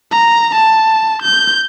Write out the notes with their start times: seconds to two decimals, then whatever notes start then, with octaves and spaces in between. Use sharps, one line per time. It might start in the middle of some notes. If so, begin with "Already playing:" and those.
0.11 A#5
0.55 A5
1.22 G6